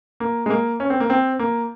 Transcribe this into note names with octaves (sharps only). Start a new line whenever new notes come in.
A#3
G#3
A#3
C#4
C4
A#3
C4
A#3